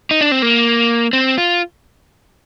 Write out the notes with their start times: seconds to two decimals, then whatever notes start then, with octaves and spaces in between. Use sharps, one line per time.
0.11 D#4
0.21 D4
0.32 C4
0.42 A#3
1.13 C4
1.38 F4